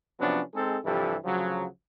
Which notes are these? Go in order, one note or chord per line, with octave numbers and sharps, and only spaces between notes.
C3 F3 F#3 B3 C#4 D4
G#3 C4 D#4 G#4 A4
G2 C3 E3 F3 G4 A4
D2 C#3 F3 F#3